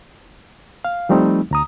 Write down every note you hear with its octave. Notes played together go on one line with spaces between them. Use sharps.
F5
F3 G3 A3 C4 D#4
D2 A#5 D#6